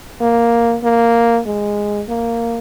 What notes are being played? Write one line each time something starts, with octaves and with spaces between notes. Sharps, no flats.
A#3
A#3
G#3
A#3